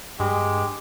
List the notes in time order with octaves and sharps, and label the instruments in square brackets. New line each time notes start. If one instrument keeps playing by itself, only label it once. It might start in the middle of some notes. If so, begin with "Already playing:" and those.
[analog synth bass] G2 [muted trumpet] G#3 [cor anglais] G4